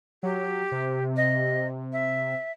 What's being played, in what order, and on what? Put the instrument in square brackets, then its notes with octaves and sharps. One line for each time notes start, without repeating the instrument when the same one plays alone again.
[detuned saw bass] F#3 [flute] G4
[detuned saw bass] C3
[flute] D#5
E5